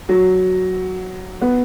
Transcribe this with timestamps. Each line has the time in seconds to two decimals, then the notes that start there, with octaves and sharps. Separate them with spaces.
0.09 F#3
1.41 B3